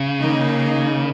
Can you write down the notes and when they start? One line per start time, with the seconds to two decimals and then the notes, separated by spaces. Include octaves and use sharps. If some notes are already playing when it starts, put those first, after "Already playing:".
Already playing: C#3
0.20 D#3 A#3 D#4